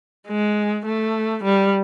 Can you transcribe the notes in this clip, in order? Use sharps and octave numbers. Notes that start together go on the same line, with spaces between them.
G#3
A3
G3